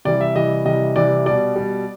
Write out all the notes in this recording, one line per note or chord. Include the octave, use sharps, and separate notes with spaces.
C3 E3 G3 D5
E5
C3 E3 G3 D#5
C3 E3 G3 D#5
C3 E3 G3 D5
B2 G3 D5
B2 G3